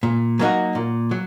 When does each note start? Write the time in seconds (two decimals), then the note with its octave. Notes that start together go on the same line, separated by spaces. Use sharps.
0.03 A#2
0.39 F#3 A#3 D#4 F#4
0.75 A#2
1.11 F#3